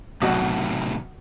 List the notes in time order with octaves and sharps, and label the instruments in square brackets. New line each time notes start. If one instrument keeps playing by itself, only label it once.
[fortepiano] B1 F#4 D#5 [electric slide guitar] A2 C3 D#3